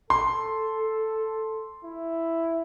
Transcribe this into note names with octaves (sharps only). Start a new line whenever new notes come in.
A4 C6
E4